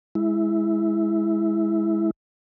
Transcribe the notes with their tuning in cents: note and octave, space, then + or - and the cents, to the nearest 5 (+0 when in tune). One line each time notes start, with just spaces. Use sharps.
G#3 +0 E4 -5